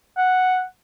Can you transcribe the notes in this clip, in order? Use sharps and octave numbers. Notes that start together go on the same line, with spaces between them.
F#5